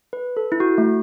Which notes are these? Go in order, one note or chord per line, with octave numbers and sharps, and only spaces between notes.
B4
A4
E4
F#4
A3